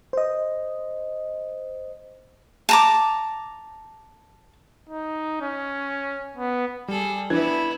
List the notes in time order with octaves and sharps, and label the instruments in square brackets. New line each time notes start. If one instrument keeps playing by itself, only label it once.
[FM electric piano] C5 D#5
[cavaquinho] A5 A#5 D6
[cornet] D#4
C#4
B3
[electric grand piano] G3 [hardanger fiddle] G#4 A4
[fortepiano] E3 D4 [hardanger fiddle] B3 E4 [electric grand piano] G#6